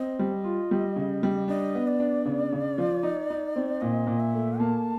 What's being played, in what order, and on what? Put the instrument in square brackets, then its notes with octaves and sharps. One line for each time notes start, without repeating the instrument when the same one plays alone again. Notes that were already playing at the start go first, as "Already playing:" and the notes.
Already playing: [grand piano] C4 [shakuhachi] D#5
[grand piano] G3
F4
G3
C#3
G3
[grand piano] D4 [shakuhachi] D#5
[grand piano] B3
[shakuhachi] D5
[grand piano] D4
C#3
C#3
F3
D#4
D#4
C4
[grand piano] A#2 [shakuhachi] D#5
[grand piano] A#2
[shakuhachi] E5
[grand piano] A3
[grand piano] A#3 [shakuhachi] A5